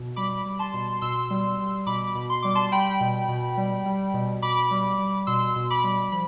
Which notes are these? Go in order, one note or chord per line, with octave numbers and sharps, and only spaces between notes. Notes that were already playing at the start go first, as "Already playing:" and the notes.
Already playing: B2
G3 B5 D6
G3
A5 C6
B2
B2 C6 E6
G3
G3
B2 B5 D6
B2
C6
G3 D6
A5 C6
G3 G5 B5
B2
B2
G3
G3
B2
B2 B5 D6
G3
G3
B2 C6 E6
B2
B5 D6
G3
F3 B5